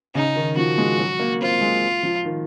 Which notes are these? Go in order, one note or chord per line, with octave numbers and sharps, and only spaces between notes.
C#3 D#4
D#3
F3 F#4
G#3
F#3
A#3
C4 F4
G#3
F3
D#3